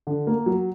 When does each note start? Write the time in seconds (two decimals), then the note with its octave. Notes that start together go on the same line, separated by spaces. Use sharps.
0.07 D3
0.27 A#3
0.46 F#3